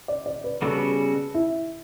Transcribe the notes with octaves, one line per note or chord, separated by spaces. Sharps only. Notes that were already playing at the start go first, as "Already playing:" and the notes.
D5
D5
B4
C#3 G3 B3 F#4 A4
E4